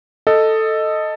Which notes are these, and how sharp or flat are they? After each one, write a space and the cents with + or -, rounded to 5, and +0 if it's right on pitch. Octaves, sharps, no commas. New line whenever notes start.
A4 +5 D#5 +0